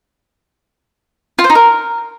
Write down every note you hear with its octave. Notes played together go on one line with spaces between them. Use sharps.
F4
C5
D#4
A#4